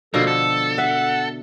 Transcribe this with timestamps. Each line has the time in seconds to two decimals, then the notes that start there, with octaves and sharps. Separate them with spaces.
0.14 B2 D3 F3 A#3 A4
0.27 A4 E6
0.78 E5 F#5